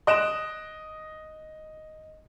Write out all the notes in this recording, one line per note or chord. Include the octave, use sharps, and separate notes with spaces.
D#5 F#6 D7 E7